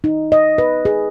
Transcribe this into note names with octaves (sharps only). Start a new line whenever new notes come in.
D#4
D#5
B4
G#4